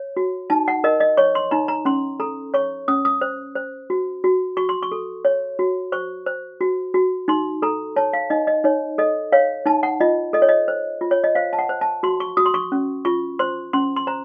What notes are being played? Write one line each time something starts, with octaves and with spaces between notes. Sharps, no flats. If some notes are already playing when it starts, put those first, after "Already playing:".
Already playing: C#5
F#4
D#4 A5
F#5
A#4 D#5
D#5
C#5 C#6
C6
D#4 A#5
A#5
C#4 C6
A4 A#5
C#5 C#6
C#4 D#6
D#6
C5
C5
F#4
F#4
F#4 C#6
C6
C#6
A4
C#5
F#4
C5 C#6
C5
F#4
F#4
D#4 C6
A4 A#5
C#5 A5
F5
D#4 D#5
D#5
D#4 C#5
A4 D#5
C#5 F5
D#4 A5
F#5
F4 D#5
A4 D#5
C#5
D#5
C5
F4
C#5
D#5
C5 F5
A5
F#5
C5
A5
F#4 C6
C#6
F#4 D#6
C6
C#6
C#4
F4 C#6
C5 C6
C#4 C6
C6
C5 A#5